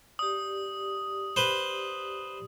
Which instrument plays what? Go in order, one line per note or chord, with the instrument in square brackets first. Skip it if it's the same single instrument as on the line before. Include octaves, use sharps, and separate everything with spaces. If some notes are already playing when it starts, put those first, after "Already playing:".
[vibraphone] G4 D5 [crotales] D#6
[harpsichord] B4 C5